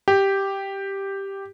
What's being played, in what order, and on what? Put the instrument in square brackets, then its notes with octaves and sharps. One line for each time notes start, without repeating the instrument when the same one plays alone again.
[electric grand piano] G4